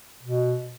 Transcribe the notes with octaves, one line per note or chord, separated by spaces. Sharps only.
B2